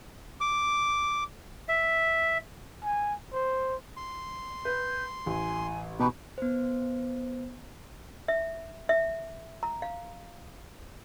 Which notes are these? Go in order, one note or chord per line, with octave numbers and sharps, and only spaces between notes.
D6
E5
G#5
C5
C6
B4 G6
A1 G#5
B2 D#4 G4 B4
B3 C5
E5
E5
A#5
F5